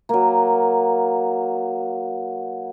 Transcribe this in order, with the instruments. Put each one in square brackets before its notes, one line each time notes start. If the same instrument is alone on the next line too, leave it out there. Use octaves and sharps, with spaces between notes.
[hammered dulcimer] F#3 A#3